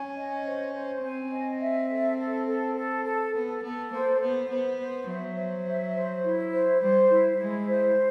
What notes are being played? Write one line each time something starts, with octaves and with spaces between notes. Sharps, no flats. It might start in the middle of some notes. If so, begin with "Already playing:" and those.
Already playing: C#4 G#5
D#5
C5
C5
C4 G#5
D#5
E5
A4
A4
A4
A4
A4
B3 A4
B3 A4
A#3 C5
B3 C5
B3 C5
C5
F#3 E5
C5
E5
C5
E4
C5
G3 C5
E4
G#3 E4
C5